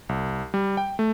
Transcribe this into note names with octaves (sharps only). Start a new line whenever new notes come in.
C2
G3
G5
A3